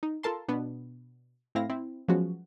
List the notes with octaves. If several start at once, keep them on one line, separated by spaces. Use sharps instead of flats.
D#4
F4 A4 A#4 A5 C6
B2 B3 D4
A2 C4 E4 F5 A#6
C4 E4
F3 F#3 G#3 B3 C#4 F#4